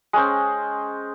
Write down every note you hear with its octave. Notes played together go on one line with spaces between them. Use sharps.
G#3 C#4 C5